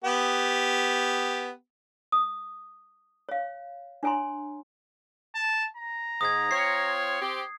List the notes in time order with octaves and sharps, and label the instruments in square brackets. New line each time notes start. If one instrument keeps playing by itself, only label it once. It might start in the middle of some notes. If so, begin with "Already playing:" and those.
[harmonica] B3 G4
[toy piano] D#6
C#5 F5
D4 C#5 G#5 A#5 C6
[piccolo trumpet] A5
A#5
[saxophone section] G#2 [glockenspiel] D#6 G#6
[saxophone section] C4 F4 C#5 [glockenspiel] C7
[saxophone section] C4 G4